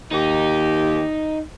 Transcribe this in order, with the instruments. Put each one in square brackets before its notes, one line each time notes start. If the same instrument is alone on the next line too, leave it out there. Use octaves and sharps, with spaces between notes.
[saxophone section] D#2 G4 [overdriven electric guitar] D#4